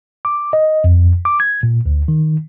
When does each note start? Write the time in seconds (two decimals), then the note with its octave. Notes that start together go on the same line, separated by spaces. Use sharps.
0.25 D6
0.53 D#5
0.84 F2
1.25 D6
1.40 G#6
1.63 A#2
1.86 D2
2.08 D#3